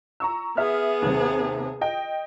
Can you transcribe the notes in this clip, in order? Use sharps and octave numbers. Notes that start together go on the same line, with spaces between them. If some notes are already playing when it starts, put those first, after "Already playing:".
A#5 C#6 E6
B3 G#4 E5 F6
D#2 C3
D#5 G5